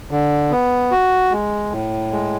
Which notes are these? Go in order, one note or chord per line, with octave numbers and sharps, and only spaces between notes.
D3
B3
F#4
G#3
A2
G#3